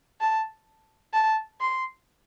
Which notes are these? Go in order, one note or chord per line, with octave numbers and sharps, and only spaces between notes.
A5
A5
C6